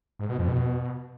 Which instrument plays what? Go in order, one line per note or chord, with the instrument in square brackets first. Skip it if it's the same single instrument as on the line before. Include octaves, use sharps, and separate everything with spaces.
[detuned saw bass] G#2
B2
F2
B2